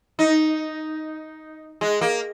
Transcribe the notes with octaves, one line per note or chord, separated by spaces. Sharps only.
D#4
G#3
A#3